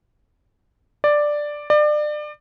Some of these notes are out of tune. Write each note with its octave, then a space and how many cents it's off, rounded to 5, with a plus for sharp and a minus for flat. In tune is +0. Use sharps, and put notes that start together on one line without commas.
D5 +5
D5 +30